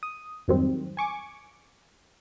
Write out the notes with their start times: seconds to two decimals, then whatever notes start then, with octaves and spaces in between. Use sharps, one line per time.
0.03 D#6
0.48 F2 G#2 D#3 F#3 G3 C4
0.97 G#5 C#6 D6